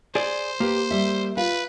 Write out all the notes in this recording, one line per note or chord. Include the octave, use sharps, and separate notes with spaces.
G#4 C5 D5
A#3 G4 B4
G3 E5
F4 B4 F5